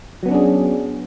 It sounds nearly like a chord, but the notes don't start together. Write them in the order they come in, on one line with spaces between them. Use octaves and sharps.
F#3 B3 C#4 D4 G#4